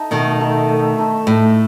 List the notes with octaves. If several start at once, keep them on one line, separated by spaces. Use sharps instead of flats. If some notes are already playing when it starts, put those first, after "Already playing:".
Already playing: D#4 A4 E5
B2 D#3 A3
D#4 A4 E5
A3
D#4 A4 E5
A2 A3